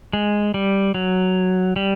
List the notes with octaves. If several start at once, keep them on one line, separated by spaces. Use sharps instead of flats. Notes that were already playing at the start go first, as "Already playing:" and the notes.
G#3
G3
F#3
G3